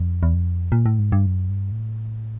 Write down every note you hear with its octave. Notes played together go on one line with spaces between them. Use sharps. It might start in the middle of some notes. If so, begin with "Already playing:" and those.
Already playing: F2
E2
F2
A#2
A2
G#2
G2
F#2
G2
A2